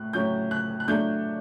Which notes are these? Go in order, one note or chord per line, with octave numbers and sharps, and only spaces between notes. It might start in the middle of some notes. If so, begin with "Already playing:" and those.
Already playing: A2 F#6
A2 F#3 C#4 G6
F#6
F#6
F#3 A3 D4 G6